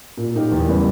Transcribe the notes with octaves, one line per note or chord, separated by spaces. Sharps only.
A#2
A#3 D#4 G4 A#4
E2
C#3 G3 B3